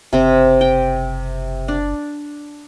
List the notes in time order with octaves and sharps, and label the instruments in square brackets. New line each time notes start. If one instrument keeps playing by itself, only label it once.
[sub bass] F#1 [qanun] C3 C4
[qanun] G5
D4